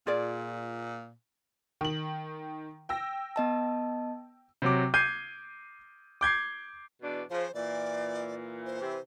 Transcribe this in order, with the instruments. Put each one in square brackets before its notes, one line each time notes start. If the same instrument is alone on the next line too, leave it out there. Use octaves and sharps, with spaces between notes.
[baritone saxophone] A#2 [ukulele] F4 G#4 D5
[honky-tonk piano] D#3 F#7
G5 E6 A#6
[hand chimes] B3 D#5 A5
[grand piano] C3 F#3 D6
D6 G6 G#6 C7 D#7
D6 G6 G#6 C7
[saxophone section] E2 B2 D4
[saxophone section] C#3 F3 [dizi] C5
[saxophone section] A#2 E3 [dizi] D5
[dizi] C5
[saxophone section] C3 E3